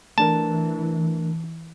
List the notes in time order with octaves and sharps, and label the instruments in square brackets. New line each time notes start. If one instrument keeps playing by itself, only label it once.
[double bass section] E3 [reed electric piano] A3 D4 A#4 [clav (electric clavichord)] A5